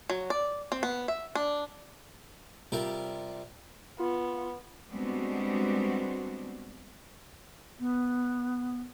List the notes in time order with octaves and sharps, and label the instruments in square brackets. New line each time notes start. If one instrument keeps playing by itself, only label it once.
[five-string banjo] F#3
D5
C4
B3
E5
D4
[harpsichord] C3 G3 F4 A#4 G5
[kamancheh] B3 [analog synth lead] F4
[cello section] G3 G#3 B3 C4 D4 F#4
[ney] B3